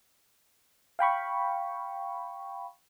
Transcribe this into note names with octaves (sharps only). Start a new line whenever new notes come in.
F5 G5 B5 C#6